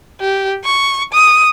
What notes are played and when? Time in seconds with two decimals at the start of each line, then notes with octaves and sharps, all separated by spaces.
0.21 G4
0.64 C#6
1.13 D#6